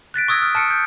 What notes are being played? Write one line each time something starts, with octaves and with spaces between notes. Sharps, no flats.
F#6 A6 B6 D7
C#6 D#6 E6 G#6 A#6
F6
A5 F6 C#7 D7
G6